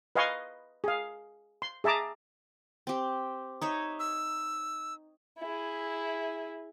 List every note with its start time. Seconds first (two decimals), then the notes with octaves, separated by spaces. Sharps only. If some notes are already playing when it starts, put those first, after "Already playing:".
0.16 B4 D#5 F5 G#5 C6 C#6
0.84 G#4 F5
1.62 C6
1.84 G#4 E5 A5 A#5 D6
2.87 C4 G4
3.62 D#4 C#5 E5
3.99 E6
5.39 E4 G#4